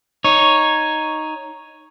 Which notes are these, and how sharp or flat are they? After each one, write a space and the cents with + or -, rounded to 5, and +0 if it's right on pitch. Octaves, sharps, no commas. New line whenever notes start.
D#4 +0 C#5 +0